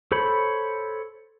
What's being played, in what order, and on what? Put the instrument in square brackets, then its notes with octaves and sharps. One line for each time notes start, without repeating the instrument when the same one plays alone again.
[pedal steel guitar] A4 C5 C#5 B5